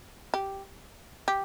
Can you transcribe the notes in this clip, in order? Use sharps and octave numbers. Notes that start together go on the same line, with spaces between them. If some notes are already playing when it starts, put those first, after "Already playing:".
G4
G4